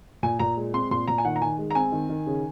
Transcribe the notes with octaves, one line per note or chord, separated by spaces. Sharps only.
A#2 G#5
A#2 A#5
G#3
C4 C6
A#2 C6
A#2 A#5
G#5
D#3 F#5
A#5
D#3 G#5
G#3
A#5
C4 G#5
D#3
D#3
C#3